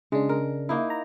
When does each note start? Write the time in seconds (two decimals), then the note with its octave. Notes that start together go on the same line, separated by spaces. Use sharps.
0.12 C#3 G#3 D4
0.29 A#4
0.69 A#3 D#4 E4
0.90 A#5